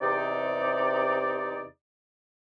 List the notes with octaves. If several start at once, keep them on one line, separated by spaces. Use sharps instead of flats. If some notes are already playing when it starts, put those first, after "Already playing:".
E2 C3 D#4 D5